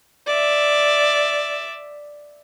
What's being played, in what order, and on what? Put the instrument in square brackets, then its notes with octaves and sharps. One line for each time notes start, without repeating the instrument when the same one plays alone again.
[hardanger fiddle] D5 E5